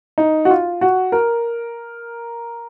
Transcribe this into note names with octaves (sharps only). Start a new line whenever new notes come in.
D#4
F#4
F4
F#4
A#4